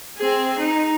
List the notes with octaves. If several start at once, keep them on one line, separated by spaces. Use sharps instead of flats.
C4 G#4
D#4